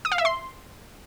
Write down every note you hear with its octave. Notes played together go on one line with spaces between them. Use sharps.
D#6
F5
E5
C6